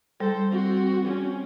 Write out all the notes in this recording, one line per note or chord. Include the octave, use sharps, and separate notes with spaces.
G3 A4 C5
C4 F#4
C4 C#4